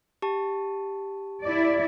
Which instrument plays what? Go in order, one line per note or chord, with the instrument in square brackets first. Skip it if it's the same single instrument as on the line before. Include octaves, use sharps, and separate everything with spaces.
[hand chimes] G4 A5
[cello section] E4 D5